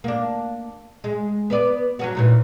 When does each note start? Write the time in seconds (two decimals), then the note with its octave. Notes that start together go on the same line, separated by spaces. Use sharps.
0.04 A#3 D4
1.04 G#3
1.50 B3 B4 D5
1.99 F#3 C#4 F#4
2.15 D#2 A#2 E3